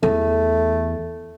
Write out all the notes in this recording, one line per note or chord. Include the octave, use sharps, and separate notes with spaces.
E2 A3